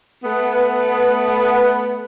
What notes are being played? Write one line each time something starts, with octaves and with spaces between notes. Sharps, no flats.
A3 B3